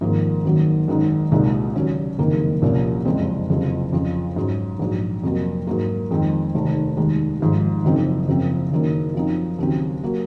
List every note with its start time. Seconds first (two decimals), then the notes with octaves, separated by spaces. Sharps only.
0.01 G#1 G#2 F3 A#3
0.45 G#1 F#2 D#3 F#3 A#3
0.88 G#1 F#2 D#3 G#3 D#4
1.32 C2 A#2 G#3 D#4
1.76 D#2 C#3 F#3 C#4
2.18 F#1 F2 C3 D#3 A#3
2.62 C2 A#2 F3 A#3 C#4
3.05 F#1 F2 C#3 G#3 C4
3.50 F#1 F2 C3 F3
3.93 F2 C#3 F3
4.36 G#2 F#3 C#4
4.79 A#1 G#2 F#3
5.23 F2 C3 F#3 A#3
5.67 G#2 F#3 A#3
6.11 F2 D#3 G#3 C4
6.54 F1 D#2 D#3
6.97 F1 D#2 D#3 G#3
7.40 G#1 G#2 F3 G#3
7.85 F#1 F#2 F3 C4 D#4
8.27 F#1 F#2 F3 C4
8.71 F#1 F#2 D#3 A#3
9.15 F#2 F3 C4 D#4
9.59 D#2 C#3 F#3 C4
10.04 F#3 A#3